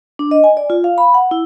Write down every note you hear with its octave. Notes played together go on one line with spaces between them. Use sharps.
D4
D#5
G#5
D5
F4
F5
B5
F#5
E4